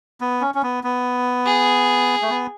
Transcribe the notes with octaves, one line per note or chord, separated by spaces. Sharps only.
B3
C#4
C#4
B3
B3
G#4
A3
B3